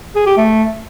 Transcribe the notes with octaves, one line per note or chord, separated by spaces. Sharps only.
G#4
G4
A3